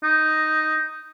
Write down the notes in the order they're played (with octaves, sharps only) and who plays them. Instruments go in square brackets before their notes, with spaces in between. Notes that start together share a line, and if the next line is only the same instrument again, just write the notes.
[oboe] D#4